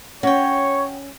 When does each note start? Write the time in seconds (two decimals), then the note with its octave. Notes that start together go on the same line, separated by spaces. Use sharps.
0.23 C#4 F#4 C#5 G5